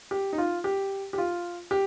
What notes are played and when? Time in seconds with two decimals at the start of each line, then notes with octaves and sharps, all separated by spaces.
0.11 G4
0.33 D#4
0.38 F4
0.64 G4
1.13 G4
1.18 F4
1.71 G4